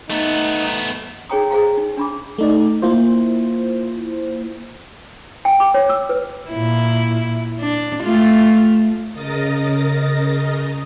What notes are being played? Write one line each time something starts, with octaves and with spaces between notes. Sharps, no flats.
A3 B3 D#4
D#4 G#4 C#5 G5 A#5 D#6
G#4 C5 F5 A#5
D#4
D4 B5 D6
A3 D#4 D5
A#3 E4 F4 C5
G5
D6
C#5
E6
B4
A#2 E4
D4
A3 F4
C#3 A#4 D#5 D#6 A6 A#6